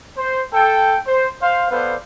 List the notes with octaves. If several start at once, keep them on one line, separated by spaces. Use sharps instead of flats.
C5
A4 G5
C5
C5 F5
B3 A4 B4 C5 D5 F5